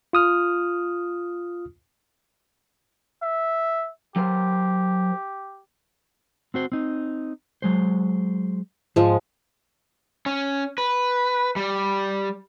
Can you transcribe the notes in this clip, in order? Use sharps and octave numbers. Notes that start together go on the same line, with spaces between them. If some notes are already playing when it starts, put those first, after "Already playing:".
F4 D#6 F6
E5
F#3 G4 A#4 C5
C4 F#4 C5
C4 D#4
F#3 G#3 C5
G#2 F3 G#3
C#4
B4
G3